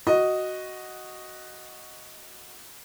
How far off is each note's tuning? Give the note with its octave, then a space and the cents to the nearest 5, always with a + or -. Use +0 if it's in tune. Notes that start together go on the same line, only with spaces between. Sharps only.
F#4 +0 D#5 +0